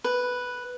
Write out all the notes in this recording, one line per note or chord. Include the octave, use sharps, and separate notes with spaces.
B4